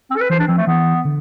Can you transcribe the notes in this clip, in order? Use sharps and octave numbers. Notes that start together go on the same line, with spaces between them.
C4
A4
B4
E3 C5
D4
F3 C4
A3
E3 B3
D3